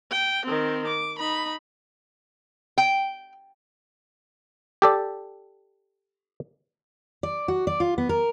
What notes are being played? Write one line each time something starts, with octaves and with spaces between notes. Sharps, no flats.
G5
D#3 C4
D6
D#4 B5
G5
G4 A4 D5
D5
F#4
D5
F4
B3
A#4